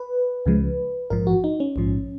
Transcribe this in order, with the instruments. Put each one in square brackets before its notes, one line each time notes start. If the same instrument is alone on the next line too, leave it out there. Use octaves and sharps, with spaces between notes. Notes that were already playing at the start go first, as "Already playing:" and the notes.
Already playing: [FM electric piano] B4
C#2 C#3 F3 G#3
A#1 G#2 F3 A#4
F#4
D#4
C#4
A#1 G#2 F3